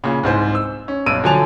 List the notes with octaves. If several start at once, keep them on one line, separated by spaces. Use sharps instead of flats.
A#2 C#3
C2 G#2 C5
E6
C#4
B1 G2 E6 D7 D#7
D3 F3 F#3 G#5 A5 F7